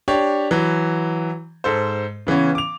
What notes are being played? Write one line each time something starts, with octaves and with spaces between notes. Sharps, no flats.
D4 G4 C#5
E3 F#3
G#2 A4 C5
C#3 E3 B3 C#4
D6 F7